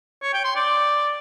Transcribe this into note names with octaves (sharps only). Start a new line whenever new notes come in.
C#5
G5
C6
D5